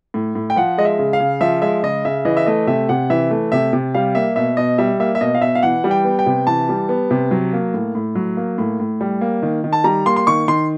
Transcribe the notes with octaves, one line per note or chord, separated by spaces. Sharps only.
A2
A2
G5
F3 F#5
G#3 D#5
E5
C#3
F5
C#3
F3 E5
G#3 E5
C#3 D#5
C#3 E5
E3 D#5
E5
A3 D#5
C3 E5
C3 F#5
E3 E5
A3
C3 E5
C3
G3 F5
A#3 E5
B2 E5
B2 D#5
G3 E5
A#3 E5
E5
B2 D#5
F5
B2 E5
F5
E3 F#5
G3
G5
B3
G5
C3
E3 A5
G3
B3
C3
F#3
A#3
A2
A2
F#3
A#3
A2
A2
G3
A#3
D#3
D#3
A5
G3 A#5
A#3 C6
C6
D#3 C#6
D#3 C6